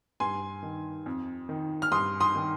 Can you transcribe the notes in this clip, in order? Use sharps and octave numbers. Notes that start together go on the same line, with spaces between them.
G2 G#5 C6
D#3
F2
D#3
F6
G2 C6 D#6
C6 D#6
D#3